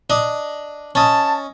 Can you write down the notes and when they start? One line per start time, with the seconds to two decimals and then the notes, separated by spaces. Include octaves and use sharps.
0.10 D4 D#5
0.95 C#4 D#5 A5